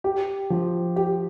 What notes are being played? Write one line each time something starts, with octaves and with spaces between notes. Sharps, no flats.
G4
F3
G4